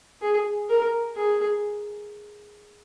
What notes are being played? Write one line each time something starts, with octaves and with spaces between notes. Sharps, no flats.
G#4
A#4
G#4